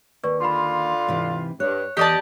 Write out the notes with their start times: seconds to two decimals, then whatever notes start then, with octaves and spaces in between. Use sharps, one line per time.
0.23 D#2 B4 D5 C#6
0.40 D3 F4 B5 C6
1.07 G#2 C3 E3
1.60 G2 C#5 F#6
1.97 E2 G4 D5 D#5 A5